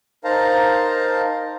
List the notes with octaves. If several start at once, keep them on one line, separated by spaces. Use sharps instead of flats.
D#4 A#4 C5 F5 A5 A#5